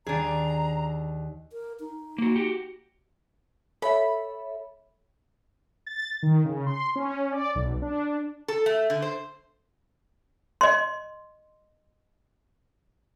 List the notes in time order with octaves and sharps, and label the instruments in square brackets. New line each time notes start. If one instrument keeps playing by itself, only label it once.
[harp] D#2 [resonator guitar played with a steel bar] D4 G#4 [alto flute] A#5
[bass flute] A#4
D#4
[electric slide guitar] A#3 F#4
F#4 G4
[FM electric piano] A4 C#5 E5 [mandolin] B5
[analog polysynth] A6
D#3
C#3
C6
C#4
D5
B1
D4
[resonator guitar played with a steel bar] A4
A3
D3
C5
[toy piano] D#5 C6